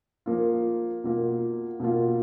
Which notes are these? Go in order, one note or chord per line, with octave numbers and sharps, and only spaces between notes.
F3 A#3 F4
B2 A#3 F4
B2 A#3 F4